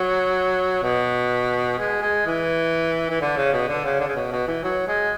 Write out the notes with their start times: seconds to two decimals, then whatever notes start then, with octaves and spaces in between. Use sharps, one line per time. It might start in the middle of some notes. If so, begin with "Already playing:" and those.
Already playing: F#3
0.83 B2
1.79 G#3
2.02 G#3
2.26 E3
3.10 E3
3.21 D3
3.37 C#3
3.53 B2
3.68 D3
3.85 C#3
4.00 D3
4.08 C#3
4.16 B2
4.32 B2
4.47 E3
4.63 F#3
4.88 G#3